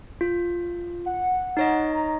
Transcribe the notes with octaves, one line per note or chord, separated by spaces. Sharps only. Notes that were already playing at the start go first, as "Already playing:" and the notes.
F4
F#5
D#4 C#5 D#5
A#5